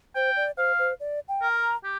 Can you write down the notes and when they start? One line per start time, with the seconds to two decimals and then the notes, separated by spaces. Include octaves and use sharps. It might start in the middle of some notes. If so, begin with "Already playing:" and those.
0.15 C5 G5
0.36 D5
0.57 C5 F5
0.79 C5
1.00 D5
1.28 G5
1.42 A#4
1.56 A#5
1.84 G4